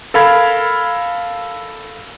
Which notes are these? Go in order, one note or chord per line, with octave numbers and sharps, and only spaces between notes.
A4 A#4 F5 B5 F6 G#6